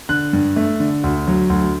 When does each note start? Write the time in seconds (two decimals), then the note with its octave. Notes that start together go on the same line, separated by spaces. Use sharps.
0.09 D3 F#6
0.33 G2
0.56 A3
0.80 D3
1.04 D2
1.28 F#3
1.50 D2